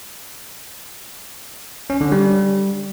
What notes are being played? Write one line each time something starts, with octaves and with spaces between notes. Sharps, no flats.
C#4
D3
G3